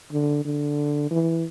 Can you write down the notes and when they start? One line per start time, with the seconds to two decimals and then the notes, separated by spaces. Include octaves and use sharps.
0.13 D3
0.45 D3
1.11 E3